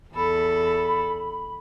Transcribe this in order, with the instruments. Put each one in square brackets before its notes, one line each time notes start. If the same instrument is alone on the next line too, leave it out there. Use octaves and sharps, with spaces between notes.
[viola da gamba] E2 A4 [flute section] B5